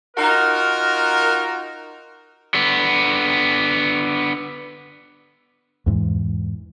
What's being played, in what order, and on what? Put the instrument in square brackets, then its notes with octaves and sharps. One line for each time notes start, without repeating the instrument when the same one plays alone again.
[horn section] D#4 F4 F#4 A#4
[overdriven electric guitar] D3 B3
[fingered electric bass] E2 G#2 E3